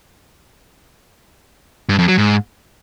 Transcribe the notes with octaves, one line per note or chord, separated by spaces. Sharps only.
G2
F2
F#3
G#2